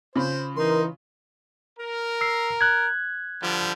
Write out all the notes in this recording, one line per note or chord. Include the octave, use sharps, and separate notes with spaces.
C#3 F4 C5 B5
E3 D#4 A#4 C6
A#4
E6 C7
F#6 G#6
D3 F3 G3